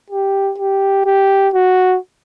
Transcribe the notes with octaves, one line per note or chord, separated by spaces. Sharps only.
G4
G4
G4
F#4